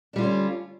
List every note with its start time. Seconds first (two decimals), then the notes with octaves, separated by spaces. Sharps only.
0.13 D4
0.16 G3
0.18 F4
0.21 D3
0.23 C#4